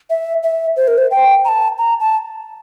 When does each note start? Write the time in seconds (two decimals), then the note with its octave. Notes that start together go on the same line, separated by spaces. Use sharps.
0.10 E5
0.43 E5
0.76 C5
0.88 A#4
0.98 C5
1.11 G5
1.45 A#5
1.48 A5
1.78 A#5
2.00 A5